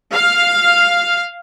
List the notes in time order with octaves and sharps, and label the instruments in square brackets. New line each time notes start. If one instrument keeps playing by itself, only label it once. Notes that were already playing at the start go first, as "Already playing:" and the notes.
[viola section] F5